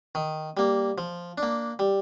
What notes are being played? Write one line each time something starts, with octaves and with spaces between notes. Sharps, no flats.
D#3
G3 A#3
F3
D4
A#3
G3